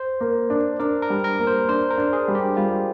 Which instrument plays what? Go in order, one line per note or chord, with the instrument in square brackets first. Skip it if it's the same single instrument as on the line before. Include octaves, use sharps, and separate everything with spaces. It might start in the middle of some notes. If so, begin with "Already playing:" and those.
Already playing: [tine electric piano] C5
[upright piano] A#3
D4
[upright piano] D4 [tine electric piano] A#4
[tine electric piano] A#4
[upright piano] G3
[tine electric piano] A#4
[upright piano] A#3
[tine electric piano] C5
[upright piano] D4 [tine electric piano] C5
[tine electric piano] A#4
[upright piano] D4
[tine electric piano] G#4
[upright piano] G3
[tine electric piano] G4
[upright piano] G3 [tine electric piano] F4